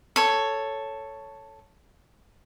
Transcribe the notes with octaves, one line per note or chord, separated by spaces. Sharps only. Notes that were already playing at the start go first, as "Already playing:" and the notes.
A4 C#5